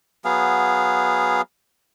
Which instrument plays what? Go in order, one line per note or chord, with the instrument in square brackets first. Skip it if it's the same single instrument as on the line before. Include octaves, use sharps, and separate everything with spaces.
[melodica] F#3 B3 G#4 F5